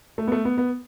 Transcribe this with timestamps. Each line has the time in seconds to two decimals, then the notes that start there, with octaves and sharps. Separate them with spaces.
0.18 A3
0.27 B3
0.32 A3
0.45 B3
0.58 B3